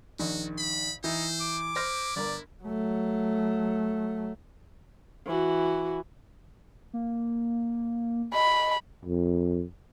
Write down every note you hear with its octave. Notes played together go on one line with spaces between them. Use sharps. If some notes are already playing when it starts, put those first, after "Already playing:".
A#1 D#3 F#4
B5
E3 D#4 C5
D6
E4 C5 F6 A#6
G1 A#4 D5
F#3 A3
E3 F#4
A#3
D#5 B5
F2